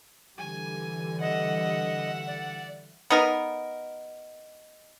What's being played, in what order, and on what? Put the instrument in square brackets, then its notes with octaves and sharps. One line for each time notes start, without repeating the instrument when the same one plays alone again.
[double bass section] D3 E3 G3 [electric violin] G#5
[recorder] D#5 [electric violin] E5 F#5
[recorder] D5
[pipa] B3 D#4 A#4